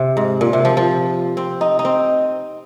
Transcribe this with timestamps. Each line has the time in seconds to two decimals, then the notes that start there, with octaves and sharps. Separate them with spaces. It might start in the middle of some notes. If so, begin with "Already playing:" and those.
Already playing: C3
0.17 G#2
0.41 A#2
0.53 C3
0.65 F3
0.77 F3
1.37 C4
1.61 D#4
1.79 D#4
1.85 C4